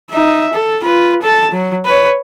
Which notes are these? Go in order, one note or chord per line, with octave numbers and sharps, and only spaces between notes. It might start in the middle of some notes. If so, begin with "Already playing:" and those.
D#4 E5
A4
F4 B4
A4 A5
F#3
B4 C#5